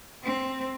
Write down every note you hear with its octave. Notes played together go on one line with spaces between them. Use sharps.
C4